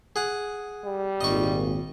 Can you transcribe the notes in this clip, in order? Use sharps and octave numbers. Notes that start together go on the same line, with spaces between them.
G#4 F#5
G3
G#1 A#2 D#5 C#6